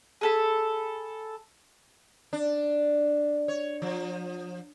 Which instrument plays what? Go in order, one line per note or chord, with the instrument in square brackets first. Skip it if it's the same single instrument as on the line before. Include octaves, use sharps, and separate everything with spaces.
[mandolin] G#4 A4 B5
[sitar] D4
C#5
F3